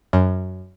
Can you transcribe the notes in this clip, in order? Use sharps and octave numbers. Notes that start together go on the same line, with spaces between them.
F#2